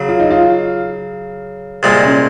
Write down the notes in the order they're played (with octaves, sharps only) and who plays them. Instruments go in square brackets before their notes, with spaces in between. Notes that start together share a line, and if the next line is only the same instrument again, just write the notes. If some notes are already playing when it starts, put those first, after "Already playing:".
Already playing: [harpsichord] C#3 F#3
[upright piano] F4
D#4
F4
[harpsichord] C2 A#2 G#3
[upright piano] C#4